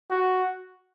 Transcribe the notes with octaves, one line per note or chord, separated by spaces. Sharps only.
F#4